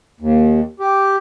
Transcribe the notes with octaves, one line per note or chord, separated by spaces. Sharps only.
D#2
G4